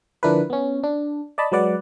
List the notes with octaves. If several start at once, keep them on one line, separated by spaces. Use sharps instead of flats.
D3 F3 D4 E4 A#4 B4
B3 C#4
D4
D5 D#5 A5 B5
F#3 G#3 B4 D5 F#5